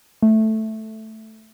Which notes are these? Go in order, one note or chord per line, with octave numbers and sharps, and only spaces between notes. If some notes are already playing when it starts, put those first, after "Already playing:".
A3